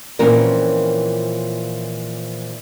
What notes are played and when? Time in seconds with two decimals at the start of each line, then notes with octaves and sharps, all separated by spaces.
0.19 A#2 E3 F3 C4 C#4 A#4